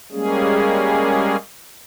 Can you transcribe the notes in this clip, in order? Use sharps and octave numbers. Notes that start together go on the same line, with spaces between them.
G3 G#3 A#3 C#4 G#4